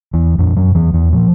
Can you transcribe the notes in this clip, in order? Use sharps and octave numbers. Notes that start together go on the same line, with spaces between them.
E2 E3
F2 A#2 F3
F#2 F#3
E2 E3
E2 E3
A#2 F3